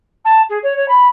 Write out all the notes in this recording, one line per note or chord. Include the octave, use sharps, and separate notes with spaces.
A5
G#4
C#5
C#5
B5